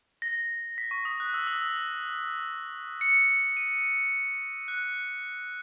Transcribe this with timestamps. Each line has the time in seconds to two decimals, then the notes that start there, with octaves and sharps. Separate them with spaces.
0.22 A#6
0.78 B6
0.91 C#6
1.05 D#6
1.20 F#6
1.34 E6
1.47 D#6
1.61 E6
3.01 C#7
3.57 D#7
4.68 F#6